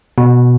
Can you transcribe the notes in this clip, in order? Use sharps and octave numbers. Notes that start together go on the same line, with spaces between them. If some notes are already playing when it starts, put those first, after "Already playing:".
B2